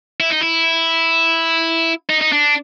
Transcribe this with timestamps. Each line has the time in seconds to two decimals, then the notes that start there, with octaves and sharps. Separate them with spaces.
0.20 E4
0.30 D#4
0.41 E4
2.10 D#4
2.21 D#4
2.32 D4